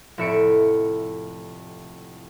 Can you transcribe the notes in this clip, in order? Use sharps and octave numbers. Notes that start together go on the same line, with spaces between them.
F1 A2 E5 C#7 D7